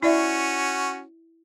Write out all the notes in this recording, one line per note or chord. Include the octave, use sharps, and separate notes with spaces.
C#4 E4 F#4 D5 E5